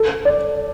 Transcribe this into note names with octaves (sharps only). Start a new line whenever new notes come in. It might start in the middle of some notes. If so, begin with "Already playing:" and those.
Already playing: A4
D5